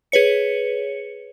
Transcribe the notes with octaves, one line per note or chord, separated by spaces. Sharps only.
G#4 B4 C#5 C#7